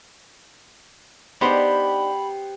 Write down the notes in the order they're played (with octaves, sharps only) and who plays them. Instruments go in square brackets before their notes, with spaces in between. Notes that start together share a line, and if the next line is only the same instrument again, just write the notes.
[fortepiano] B3 C5 [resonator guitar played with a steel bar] D4 D#4 [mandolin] G4 [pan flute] B5